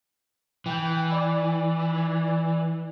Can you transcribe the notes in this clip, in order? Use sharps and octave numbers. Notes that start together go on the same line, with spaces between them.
E3 G5
D5